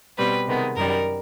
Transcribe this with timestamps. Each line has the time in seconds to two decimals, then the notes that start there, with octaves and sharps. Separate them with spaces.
0.18 B2 G3 C4 B4
0.47 C3 D#3 G#3 B3
0.76 F#2 D#3 G3 A#4